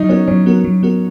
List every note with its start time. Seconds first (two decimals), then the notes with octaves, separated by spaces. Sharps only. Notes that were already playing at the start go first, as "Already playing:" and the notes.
Already playing: F#3 D#4
0.09 B3 C#4 F#4 A#4
0.27 F#3 C#4
0.46 B3 F#4 A#4
0.64 F#3
0.83 B3 F#4 A#4